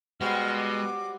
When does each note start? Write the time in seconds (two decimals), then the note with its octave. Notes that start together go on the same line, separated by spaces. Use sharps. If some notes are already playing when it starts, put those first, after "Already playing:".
0.21 B2 G3 G#3 F#4 C5 F6
0.57 D6